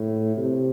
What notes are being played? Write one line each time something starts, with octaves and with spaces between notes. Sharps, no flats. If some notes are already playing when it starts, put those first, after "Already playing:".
Already playing: A2
C3